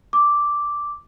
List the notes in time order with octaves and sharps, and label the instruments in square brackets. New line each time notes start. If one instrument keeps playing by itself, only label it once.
[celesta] D6